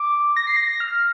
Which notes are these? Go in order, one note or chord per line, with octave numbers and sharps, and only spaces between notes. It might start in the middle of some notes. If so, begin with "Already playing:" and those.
Already playing: D6
A#6
C7
A#6
A#6
F6